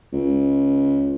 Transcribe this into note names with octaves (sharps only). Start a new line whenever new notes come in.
C#2